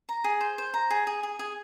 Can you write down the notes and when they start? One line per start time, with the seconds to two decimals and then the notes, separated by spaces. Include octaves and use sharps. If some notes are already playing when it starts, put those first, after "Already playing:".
0.09 A#5
0.24 G#4
0.41 C5
0.58 C5
0.74 A#5
0.90 G#4
1.07 G#4
1.23 G#4
1.39 G#4